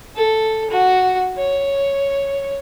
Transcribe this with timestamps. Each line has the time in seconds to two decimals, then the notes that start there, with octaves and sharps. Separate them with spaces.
0.16 A4
0.70 F#4
1.38 C#5